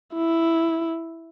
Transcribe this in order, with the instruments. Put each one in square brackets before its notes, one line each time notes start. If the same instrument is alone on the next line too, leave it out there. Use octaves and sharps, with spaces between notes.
[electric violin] E4